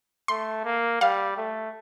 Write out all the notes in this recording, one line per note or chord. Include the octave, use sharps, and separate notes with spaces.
A3 C6
A#3
G3 F5
A3